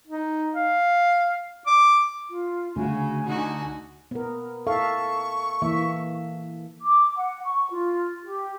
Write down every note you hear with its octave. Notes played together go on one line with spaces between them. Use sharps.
D#4
F5
D6
F4
D2 C#3 F#4 G#5
D3 D#4 F#4
B3 A#4
A4 E5 F5 C#6
E3 A#3 E5
D6
F#5
C#6
F4
G4